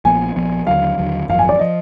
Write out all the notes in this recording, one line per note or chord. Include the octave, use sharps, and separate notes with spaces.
A#1 A#2 F3 B3 G#5
A#1 A#2 F3 B3
D#2 D3 F#3 F5
D#2 D3 F#3
G#1 F#2 F3 F5
G#5
D5
F3 D#5